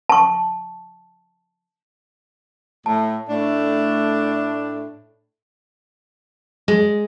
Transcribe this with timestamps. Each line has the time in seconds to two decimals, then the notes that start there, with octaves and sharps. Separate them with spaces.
0.09 A5 C#6
2.86 A2 A5
3.28 A2 A3 D4
6.68 G#3